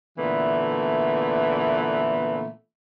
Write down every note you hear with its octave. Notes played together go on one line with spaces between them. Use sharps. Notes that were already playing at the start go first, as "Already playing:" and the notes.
A#2 D3 E3 A3 B3